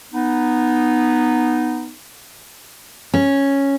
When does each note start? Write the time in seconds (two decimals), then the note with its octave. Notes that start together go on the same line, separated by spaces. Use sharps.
0.13 B3 D#4
3.14 C#4